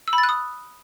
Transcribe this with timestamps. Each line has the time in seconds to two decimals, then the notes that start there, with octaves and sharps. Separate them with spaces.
0.08 E6
0.13 B5
0.18 A6
0.23 F#6
0.29 D#6